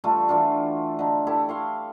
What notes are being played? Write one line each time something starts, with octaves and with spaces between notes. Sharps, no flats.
G3 A3 F4 A4
E3 D4 F4 F#4
D3 D#4
E4 G4 A4
F5 C6 C#6